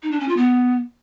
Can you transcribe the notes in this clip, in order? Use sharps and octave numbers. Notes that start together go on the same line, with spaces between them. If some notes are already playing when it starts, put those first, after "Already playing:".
D#4
D4
C#4
F4
B3